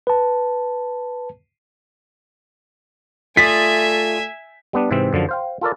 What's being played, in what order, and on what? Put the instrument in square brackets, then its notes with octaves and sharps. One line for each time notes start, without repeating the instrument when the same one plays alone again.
[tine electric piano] B4 A5
[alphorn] A3 [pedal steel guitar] F4 D5 D#6 [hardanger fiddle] E5 G#5 [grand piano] B6
[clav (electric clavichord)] G3 B3 D4
G#2 C3 E3 C4 E5
F#2 D3 F3
C5 F5 G5
F4 A4 A#4 D5